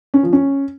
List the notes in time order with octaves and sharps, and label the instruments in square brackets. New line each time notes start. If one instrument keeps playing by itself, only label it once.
[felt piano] C#4
F3
C#4